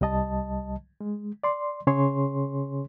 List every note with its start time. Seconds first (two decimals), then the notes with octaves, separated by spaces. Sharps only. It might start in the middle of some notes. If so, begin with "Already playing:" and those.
0.01 C2 G3 D#5 A5
1.01 G#3
1.44 D5 C6
1.87 C#3 C#4 G#4 C#5 C6